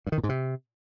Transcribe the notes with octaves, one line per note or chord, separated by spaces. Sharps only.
G2
D#3
A#2
G#2
C3